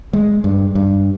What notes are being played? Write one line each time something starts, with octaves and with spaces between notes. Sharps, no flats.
G#3
G2
G2